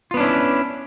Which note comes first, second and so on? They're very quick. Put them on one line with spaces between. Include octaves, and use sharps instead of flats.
F4 B3 D4 C#4 E4